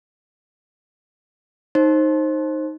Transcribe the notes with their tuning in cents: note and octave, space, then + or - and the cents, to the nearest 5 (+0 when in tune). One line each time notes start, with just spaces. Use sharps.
D#4 +0 C5 +20